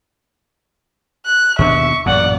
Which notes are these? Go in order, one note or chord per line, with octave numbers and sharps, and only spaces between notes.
F#6
D#2 B2 D4 E5 C#6
A1 F#2 A#2 D5 F#5